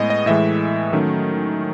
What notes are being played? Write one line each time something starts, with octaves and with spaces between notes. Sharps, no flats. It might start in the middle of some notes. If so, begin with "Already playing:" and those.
Already playing: A2 G#3 B3 D#5
D#5
A2 E3 G#3 E5
D#3 F#3 A3 C#4